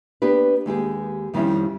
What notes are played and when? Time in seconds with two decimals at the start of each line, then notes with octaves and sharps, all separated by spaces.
0.22 B3 D4 G4 B4
0.66 D#2 G#3 G4 G#4
1.33 F2 D#3 G3 C4 C#4 E4